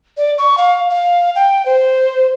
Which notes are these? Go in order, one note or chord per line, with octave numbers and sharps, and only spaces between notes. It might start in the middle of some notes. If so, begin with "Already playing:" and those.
D5
C#6
F5
F5
G5
C5